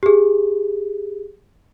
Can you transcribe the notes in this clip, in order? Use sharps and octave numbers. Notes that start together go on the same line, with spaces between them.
G4 G#4